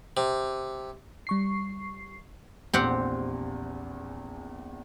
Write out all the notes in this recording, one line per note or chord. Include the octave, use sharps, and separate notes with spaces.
C3
G3 C#6 C7
A#1 E2 C4 G4 F#5